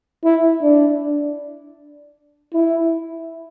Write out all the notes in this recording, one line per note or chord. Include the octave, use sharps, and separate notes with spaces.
E4
D4
E4